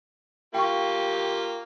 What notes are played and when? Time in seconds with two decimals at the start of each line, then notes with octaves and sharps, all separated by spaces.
0.54 A#3 F4 G4 G5 C#6